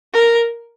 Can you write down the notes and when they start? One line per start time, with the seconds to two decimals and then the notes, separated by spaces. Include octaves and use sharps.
0.14 A#4